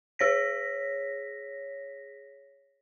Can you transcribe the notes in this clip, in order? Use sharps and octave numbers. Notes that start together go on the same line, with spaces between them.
G#4 C#5 A#6 B6